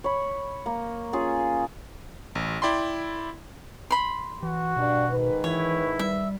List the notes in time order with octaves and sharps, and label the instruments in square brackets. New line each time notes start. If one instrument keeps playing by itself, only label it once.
[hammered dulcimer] C#5 B5
A#3
C#4 F4 G#4 C#5
[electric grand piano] A1
E4 D5 G5 B5 C6
[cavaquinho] B5 C6
[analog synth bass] E3 [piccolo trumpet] F#4
[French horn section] G2 D4 [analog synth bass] B2
[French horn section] G#2 D#3 B4
[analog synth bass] E3 [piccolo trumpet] E4 [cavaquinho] C#5
[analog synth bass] G3 [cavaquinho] E5